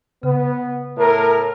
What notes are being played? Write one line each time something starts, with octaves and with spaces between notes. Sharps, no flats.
C#3 B3
A2 A#4